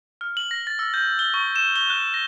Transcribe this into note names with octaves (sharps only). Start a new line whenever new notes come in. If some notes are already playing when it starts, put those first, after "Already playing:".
F6
F#7
A#6
A6
E6
G6
G7
C#6
E7
G7
F#6
A#6